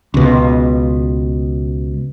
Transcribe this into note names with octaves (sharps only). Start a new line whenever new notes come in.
C#2 B2